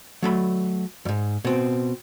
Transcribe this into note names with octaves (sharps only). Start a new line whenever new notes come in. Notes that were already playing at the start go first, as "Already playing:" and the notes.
F#3 A3 B5
F2 G#2
B2 C4